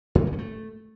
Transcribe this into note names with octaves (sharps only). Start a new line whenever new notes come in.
G#2
F#3
A3
C#4
A3